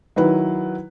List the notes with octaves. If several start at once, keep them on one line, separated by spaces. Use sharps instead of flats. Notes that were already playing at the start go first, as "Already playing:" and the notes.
D#3 F#3 E4 B4